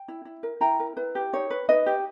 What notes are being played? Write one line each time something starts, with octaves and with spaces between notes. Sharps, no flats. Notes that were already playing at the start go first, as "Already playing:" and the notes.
Already playing: G5
E4
E4
A#4
E4 G5 A#5
A#4
E4 B4
G4
D#4 C#5
B4
D#4 B4 D#5
G4